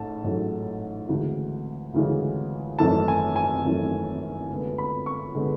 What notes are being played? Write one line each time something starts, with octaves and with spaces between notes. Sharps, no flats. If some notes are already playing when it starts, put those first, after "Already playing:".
Already playing: A1 G#2 A3 A5
A1 G#2 F#3 A3
D2 C#3 E3 G#3
D2 C#3 E3 G#3
G#1 F#2 E3 A3 A5
G#5
G#5
G#1 F#2 E3 A3
D2 D3 G#3 B3
B5
C#6
D3 G#3 B3